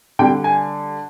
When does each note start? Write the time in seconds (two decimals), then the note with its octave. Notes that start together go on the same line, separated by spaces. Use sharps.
0.19 D3 G3 G5
0.44 G#5